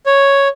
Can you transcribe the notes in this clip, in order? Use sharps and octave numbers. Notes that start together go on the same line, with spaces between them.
C#5